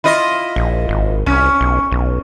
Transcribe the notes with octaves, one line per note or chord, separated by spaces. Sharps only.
E4 F4 D#5
A#1
G#1
C2 C#4
B1
B1